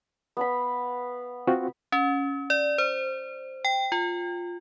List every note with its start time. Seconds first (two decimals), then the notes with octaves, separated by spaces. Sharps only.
0.37 B3 F5 B5
1.47 C4 F4 F#4
1.92 C#4
2.50 D5
2.78 C5
3.65 G5
3.92 F4